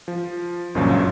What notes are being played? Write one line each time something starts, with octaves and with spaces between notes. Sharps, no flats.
F3
G1 C#2 F#2 A#2 F3 F#3